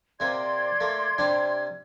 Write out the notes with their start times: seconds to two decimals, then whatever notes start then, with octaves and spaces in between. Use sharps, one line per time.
0.20 C3 A#3 D5 C6 G#6
0.80 A3 A#3
1.18 C3 G3 D4